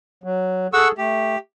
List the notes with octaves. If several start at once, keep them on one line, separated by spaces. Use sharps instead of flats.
F#3
G#4 A4 F#5 C#6 E6
A3 G4